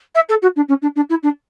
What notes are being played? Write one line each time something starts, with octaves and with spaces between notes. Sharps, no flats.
E5
A4
F#4
D4
C#4
D4
D4
E4
D4